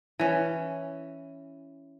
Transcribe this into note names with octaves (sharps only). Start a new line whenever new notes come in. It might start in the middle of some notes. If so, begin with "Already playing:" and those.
E3 C#4